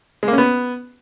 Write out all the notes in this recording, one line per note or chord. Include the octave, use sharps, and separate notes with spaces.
G#3
A#3
C#4
B3